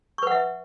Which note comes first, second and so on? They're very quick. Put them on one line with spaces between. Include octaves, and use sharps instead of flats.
C#6 B4 F#5 E5